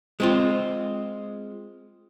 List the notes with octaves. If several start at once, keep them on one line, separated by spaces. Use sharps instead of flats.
G#3 C4 F4